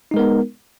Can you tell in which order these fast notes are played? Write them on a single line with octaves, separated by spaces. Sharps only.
D#4 G#3 A#4 B3